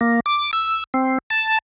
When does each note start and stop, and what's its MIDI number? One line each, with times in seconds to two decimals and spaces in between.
0.01 0.20 58
0.26 0.51 86
0.53 0.84 88
0.94 1.18 60
1.30 1.59 81